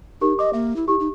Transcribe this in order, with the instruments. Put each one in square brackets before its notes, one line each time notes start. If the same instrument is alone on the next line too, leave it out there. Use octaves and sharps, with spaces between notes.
[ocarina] D#4 [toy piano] G4 A#4
[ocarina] D#5 [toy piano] D6
[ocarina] A#3 [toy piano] E5
[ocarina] E4
[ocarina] E4 [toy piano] G4
[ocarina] D#4